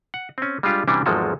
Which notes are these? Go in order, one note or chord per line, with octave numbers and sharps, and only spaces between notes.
F#5
C4 C#4
G3 G#3 D4 F4 G4
C3 E3 G3 C#4 D4 F#4
G#1 E2 F3 F#3 G#3 A4